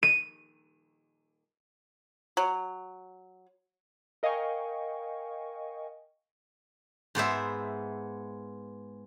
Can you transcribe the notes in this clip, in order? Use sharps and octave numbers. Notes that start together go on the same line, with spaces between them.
D#7
F#3
A#4 D#5 F5 G5 G#5 C#6
G#2 B3 C5 E5